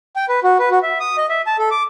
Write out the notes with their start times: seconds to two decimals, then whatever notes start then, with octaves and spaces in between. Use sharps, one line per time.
0.16 G5
0.29 B4
0.44 F#4
0.59 B4
0.71 F#4
0.82 E5
1.00 D#6
1.18 D#5
1.29 E5
1.47 A5
1.59 A4
1.71 D6